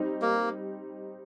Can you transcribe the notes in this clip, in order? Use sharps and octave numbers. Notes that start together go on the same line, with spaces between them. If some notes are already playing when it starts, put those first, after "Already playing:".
Already playing: G3 C4 D#4
A#3